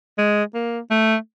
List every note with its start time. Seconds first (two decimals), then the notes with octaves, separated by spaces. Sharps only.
0.18 G#3
0.54 A#3
0.91 A3